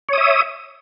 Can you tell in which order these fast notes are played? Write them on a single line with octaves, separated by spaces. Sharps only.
C#5 D#6 E5